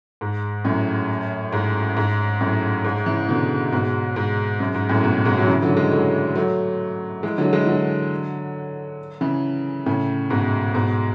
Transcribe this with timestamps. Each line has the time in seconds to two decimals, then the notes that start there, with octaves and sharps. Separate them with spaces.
0.21 G#2
0.64 F#2 A2
1.52 G#2
1.97 G#2
2.41 F#2 A2
2.85 G#2
3.06 C#3 E3
3.28 B2 D3
3.72 G#2 B2
4.16 G#2
4.60 F#2
4.74 G#2
4.89 F#2 A2
5.04 G#2 B2
5.25 G#2 B2
5.38 F#3
5.48 C#3 E3
5.62 D3 F#3
5.77 E3 G#3
5.92 F#3 A3
6.35 F#3 A3
7.23 E3 G#3
7.38 D3 F#3
7.53 E3 G#3
7.67 D3 F#3
9.21 C#3 E3
9.86 A2 C#3
10.30 G#2 B2
10.74 G#2 B2